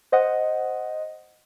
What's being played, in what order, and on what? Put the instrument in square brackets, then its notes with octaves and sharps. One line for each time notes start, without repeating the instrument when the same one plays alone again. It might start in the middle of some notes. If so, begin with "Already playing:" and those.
[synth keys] C5 D#5 F#5